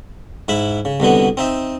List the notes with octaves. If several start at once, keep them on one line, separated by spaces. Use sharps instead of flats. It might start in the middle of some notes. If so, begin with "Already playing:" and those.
G#2 E4 E5 B5
C#3
C2 B2 D3 B3
C4 D#4 E5